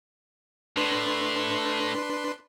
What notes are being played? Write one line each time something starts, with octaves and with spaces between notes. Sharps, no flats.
A2 D4 B4 C6